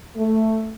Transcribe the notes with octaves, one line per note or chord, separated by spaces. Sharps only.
A3